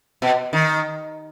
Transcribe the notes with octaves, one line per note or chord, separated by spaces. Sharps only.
B2
D#3